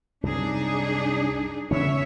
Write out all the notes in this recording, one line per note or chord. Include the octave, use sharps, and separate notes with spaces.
C2 F#2 D4 D#4 G#4
C#3 B3 C#4 C#5 E5